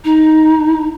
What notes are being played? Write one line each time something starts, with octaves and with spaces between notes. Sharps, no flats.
D#4